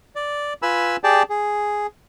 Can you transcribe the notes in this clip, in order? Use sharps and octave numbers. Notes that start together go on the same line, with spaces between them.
D5
F4 B4 G#5 B5 E6
G4 G#4 D5 G5 A5
G#4